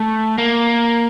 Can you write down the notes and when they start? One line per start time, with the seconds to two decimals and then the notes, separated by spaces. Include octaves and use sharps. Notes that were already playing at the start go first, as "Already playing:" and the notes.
Already playing: A3
0.38 A#3